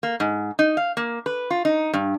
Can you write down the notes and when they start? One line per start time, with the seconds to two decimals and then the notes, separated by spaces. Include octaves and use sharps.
0.03 A#3
0.20 G#2
0.59 D#4
0.77 F5
0.97 A#3
1.26 B4
1.50 F4
1.65 D#4
1.93 G2